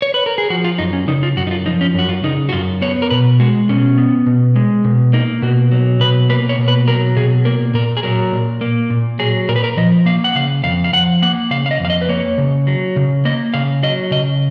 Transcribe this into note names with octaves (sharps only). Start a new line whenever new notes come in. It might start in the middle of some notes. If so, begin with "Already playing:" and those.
C#5
B4
A#4
G#4
F3 F#4
F4
F#2 D#4
C#4
C#3 D#4
F4
F#2 F#4
D#4
F4
F3 D#4
C#4
F#2 F#4
F4
C#3 D#4
F#4
F#2 F4
B3 C#5
A#4
B2 B4
G#3 F#4
B2 C#4
B3
B2
G#3
B2
A#3 D#4
B2 F#4
F#3
B2 B4
A#3 B4
C#5
B2
B4
F#3 A#4
B2 G#4
A#3 A#4
A#2 A#4
G#4
F#3 A#4
A#2
A#3
A#2
F#3 G#4
A#2 A#4
B4
A#4
F3 D#5
A#3 F5
F#5
C#3 F5
F2 F5
F5
F3 F#5
A#3 F#5
C#3 F5
F5
D#5
F2 F5
D#5
B4
A#3 C#5
C#3
F#3
C#3
A#3 D#5
C#3 F5
F#3 D#5
C#3 D#5